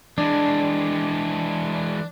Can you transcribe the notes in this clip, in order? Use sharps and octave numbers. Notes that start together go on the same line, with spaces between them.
E3 G#3 D4